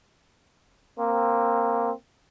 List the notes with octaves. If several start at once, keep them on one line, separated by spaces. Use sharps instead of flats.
A#3 C4